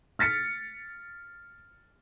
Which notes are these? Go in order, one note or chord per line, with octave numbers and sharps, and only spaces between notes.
F6 A6 B6 C#7